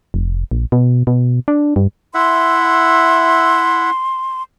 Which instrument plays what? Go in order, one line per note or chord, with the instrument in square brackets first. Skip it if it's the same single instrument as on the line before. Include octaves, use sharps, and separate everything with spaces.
[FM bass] F1
A#1
B2
B2
D4
G2
[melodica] E4 E5 F#5 [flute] C6